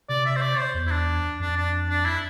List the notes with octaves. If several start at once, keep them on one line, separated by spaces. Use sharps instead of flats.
C3 D5
E5
C5
D5
C5
E2
E4
D4
F2 D4
D4
D4
E4